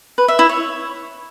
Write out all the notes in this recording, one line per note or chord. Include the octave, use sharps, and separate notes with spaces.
B4
E5
E4
C#5